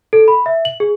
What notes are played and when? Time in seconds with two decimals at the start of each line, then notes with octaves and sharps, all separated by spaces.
0.13 A4
0.28 B5
0.46 E5
0.65 F#7
0.80 G#4